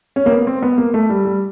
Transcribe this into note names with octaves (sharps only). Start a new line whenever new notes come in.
C#4
A#3
B3
C4
B3
A#3
A3
G3
G3